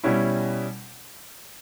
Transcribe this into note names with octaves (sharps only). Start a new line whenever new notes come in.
B2 G3 C#4 E4